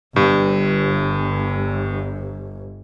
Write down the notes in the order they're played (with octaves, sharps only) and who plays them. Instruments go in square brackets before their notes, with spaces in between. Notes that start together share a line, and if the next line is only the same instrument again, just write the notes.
[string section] G1 [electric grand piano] G2